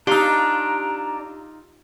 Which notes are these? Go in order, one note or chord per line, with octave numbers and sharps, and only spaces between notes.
D4 D#4 F4 G4 A#5 E6